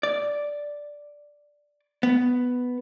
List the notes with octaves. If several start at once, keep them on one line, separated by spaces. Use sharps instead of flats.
D5
B3